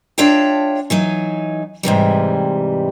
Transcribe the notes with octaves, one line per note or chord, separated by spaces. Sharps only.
D4 F4 C#5 E5 G5 A5
E3 F#3 D#4
G#2 C3 E3 G3